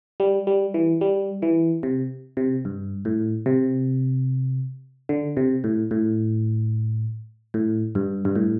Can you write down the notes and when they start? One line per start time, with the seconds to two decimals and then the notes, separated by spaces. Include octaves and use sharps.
0.20 G3
0.47 G3
0.74 E3
1.01 G3
1.42 E3
1.83 C3
2.37 C3
2.65 G2
3.05 A2
3.46 C3
5.09 D3
5.37 C3
5.64 A2
5.91 A2
7.54 A2
7.95 G2
8.25 G2
8.36 A2